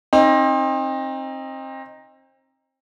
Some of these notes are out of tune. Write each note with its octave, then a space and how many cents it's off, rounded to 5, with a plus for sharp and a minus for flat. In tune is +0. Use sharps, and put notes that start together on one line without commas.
C4 +30 D#4 +0